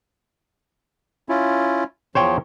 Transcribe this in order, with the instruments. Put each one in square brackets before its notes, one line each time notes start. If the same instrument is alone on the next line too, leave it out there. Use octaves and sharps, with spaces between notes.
[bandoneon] C#4 E4 F4
[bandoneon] E2 F3 [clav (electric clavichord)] C5 C#5 G5